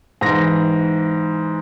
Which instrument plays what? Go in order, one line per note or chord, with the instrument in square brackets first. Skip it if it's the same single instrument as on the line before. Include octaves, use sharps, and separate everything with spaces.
[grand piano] G#2 E3 A#6